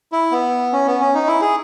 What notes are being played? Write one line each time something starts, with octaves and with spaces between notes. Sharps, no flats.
E4
B3
C#4
B3
C#4
D#4
E4
G#4